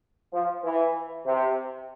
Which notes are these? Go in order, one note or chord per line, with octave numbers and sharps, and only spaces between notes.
F3
E3
C3